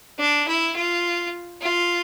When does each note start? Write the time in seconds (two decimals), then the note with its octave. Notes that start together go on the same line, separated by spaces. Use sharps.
0.19 D4
0.48 E4
0.76 F4
1.62 F4